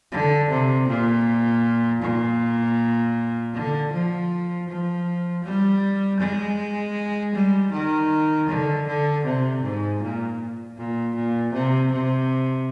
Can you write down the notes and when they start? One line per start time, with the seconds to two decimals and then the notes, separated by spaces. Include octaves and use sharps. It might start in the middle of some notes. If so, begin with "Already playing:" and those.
0.12 D3
0.50 C3
0.88 A#2
2.02 A#2
3.54 D3
3.93 F3
4.68 F3
5.44 G3
6.20 G#3
7.34 G3
7.72 D#3
8.49 D3
8.87 D3
9.24 C3
9.63 G#2
10.02 A#2
10.77 A#2
11.15 A#2
11.53 C3
11.92 C3